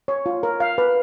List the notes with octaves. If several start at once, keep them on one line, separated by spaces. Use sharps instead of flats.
C#5
F4
A#4
F5
B4